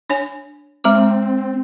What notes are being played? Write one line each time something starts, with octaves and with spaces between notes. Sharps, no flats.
D4 C#5 G#5
G#3 C4 A#5 D6